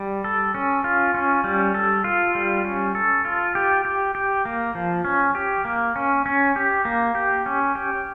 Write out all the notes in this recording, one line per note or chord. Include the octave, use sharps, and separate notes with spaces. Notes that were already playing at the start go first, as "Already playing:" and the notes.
Already playing: G3
A4
C#4
F4
C#4
G3
A4
F4
G3
C#4
A4
F4
G4
G4
G4
A#3
F3
C#4
G4
A#3
C#4
C#4
G4
A#3
G4
C#4
G4